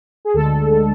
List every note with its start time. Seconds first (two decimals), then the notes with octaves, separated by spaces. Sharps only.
0.25 G#4
0.34 D2 D3 G#3 A4